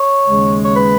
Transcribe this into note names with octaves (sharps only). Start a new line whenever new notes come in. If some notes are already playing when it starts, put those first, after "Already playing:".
Already playing: C#5
D#2 C#3 G#3
C#5
B4